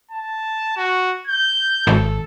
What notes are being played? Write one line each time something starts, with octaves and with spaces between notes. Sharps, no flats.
A5
F#4
G6
G#1 A4